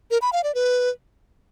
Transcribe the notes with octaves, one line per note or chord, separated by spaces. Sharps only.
A#4
B5
F5
D5
B4